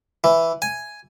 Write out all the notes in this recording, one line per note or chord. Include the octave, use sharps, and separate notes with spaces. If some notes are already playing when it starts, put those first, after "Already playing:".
E3
G#5